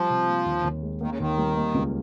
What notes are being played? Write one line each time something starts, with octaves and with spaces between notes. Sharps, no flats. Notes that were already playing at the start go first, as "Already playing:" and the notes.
Already playing: F3 G3 F4
C3
A#3
D#2
D#2
G#3
D#3 A#3
C#3
D#2 D#3
G3
A#3
C#2